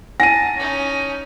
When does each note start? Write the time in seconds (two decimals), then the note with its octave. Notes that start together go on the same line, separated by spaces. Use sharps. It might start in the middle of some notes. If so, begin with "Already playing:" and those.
0.20 E4 F#5 G#5 A5 A#6 D#7
0.56 C#4 D#4